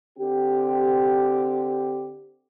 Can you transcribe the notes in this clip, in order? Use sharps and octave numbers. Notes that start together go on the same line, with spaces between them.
D3 C4 G4